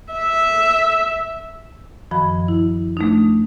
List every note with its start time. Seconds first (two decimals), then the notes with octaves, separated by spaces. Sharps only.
0.13 E5
2.11 F#2 D#3 F3 B5
2.48 E4
2.97 A3 D4 D#4